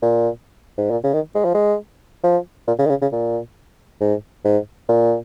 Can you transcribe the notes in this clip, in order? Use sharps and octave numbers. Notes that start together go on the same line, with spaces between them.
A#2
G#2
A#2
C#3
D#3
G#3
F3
G#3
F3
A#2
C#3
D#3
C#3
C#3
A#2
G#2
G#2
A#2